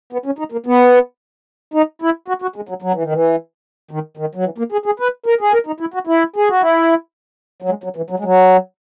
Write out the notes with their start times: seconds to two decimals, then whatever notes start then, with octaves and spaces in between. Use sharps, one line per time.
0.13 B3
0.26 C#4
0.39 D#4
0.52 A#3
0.66 B3
1.74 D#4
2.02 E4
2.28 F#4
2.42 F#4
2.56 G#3
2.69 F#3
2.82 F#3
2.93 E3
3.03 D#3
3.12 E3
3.91 D#3
4.17 D#3
4.35 F#3
4.45 E3
4.58 A#3
4.72 G#4
4.86 G#4
5.00 B4
5.26 A#4
5.41 G#4
5.53 A#4
5.67 D#4
5.80 E4
5.94 F#4
6.07 E4
6.36 G#4
6.49 F#4
6.62 E4
7.62 F#3
7.69 G#3
7.84 F#3
7.97 E3
8.10 F#3
8.19 G#3
8.24 F#3